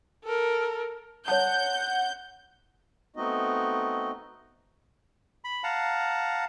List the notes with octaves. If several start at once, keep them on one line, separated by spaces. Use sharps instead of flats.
A4 A#4
C#5 F#5 A5 G6
A3 B3 C4 D#4 F#4 D#5
B5
F5 F#5 A5 A#5